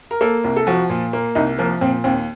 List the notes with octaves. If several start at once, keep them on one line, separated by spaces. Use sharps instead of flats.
A#4
A#3 A4
C2
A4
F3 F#4
A#2
A#3
C2 D#4
F3 A#3
A#2 C4
D#2 C4